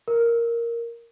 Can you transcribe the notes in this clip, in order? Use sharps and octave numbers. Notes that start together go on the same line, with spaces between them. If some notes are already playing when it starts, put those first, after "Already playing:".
A#4